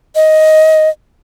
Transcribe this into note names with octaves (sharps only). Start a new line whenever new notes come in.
D#5